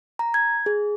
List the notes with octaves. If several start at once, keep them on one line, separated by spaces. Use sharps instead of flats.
A#5
G#6
G#4